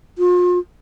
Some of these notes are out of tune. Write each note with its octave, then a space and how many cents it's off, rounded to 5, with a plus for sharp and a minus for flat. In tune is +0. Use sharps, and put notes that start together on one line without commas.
F4 +40